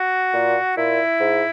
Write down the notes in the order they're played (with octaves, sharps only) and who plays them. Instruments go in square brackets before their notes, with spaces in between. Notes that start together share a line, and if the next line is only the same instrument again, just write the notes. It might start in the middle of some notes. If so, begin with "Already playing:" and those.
Already playing: [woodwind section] F#4
A#2
A#2 E4
G#2